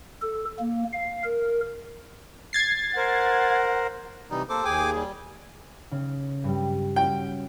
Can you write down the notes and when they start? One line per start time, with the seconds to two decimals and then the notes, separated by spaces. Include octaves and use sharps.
0.22 A4
0.59 A#3
0.93 F5
1.24 A#4
2.53 G#6 A6 C7
2.96 A#4 C5 F#5
4.31 C3 E3 G3 D#4
4.49 A#3 A4 C5 D6
4.65 D#2 G#4 G5 G#5 D6
4.96 G3
5.91 C#3
6.44 G2 G3
6.96 C#4 F#4 G5